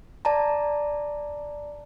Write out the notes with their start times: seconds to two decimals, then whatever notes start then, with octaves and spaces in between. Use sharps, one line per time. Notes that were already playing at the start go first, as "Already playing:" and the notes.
0.25 D5 A5 A#5